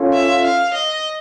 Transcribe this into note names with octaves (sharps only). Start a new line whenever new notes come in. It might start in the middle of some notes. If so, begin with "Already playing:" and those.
Already playing: C#4 F4 A4
E5
F5
D#5